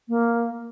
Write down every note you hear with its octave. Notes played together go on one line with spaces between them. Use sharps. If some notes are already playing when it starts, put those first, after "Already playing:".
A#3